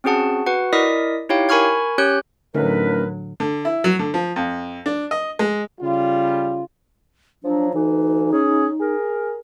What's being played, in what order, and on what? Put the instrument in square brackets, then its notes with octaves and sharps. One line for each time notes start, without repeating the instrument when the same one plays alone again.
[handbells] C4 C#4 F#4 G#4 F#5 A5
F#4 B4 F#5
E4 A#4 D5 D#5 D#6 B6
D#4 E4 G4 C#5 F5 G5
A#4 G#5 B5 C#6 F6 G#6
C#4 G4 C#5 F#6 G6
[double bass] A2 F#3 [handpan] D3 [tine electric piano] A3 C#4 D#4 [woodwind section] A#4 B4
[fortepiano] D3
E4
F#3
D3
F3
F2
D4
D#5
G#3
[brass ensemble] C#3 G3 F4
[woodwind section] F3 F#3 [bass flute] D4
[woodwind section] D2 E3 [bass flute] D#4
[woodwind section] C#4 G#4
G#4 A#4